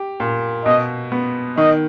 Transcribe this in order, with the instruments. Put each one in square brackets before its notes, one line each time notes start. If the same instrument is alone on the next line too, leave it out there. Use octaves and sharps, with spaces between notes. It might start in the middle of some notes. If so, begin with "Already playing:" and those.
Already playing: [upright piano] G4
A#2
[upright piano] B2 [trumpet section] D#5
[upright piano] B3
[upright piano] D#3 [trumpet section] D#5